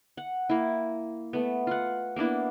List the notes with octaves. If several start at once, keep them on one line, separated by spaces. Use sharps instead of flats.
F#5
A#3 E4
A3 B3
F4 F#5
A#3 B3 D4 E4